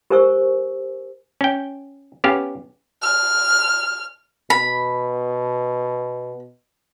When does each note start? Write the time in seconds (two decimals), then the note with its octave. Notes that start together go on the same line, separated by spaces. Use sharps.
0.10 G4 A#4 C5 G#5 C#6 E6
1.41 C#4 G5
2.24 B3 C#4 G4 F5
3.02 F6
4.50 B2 B5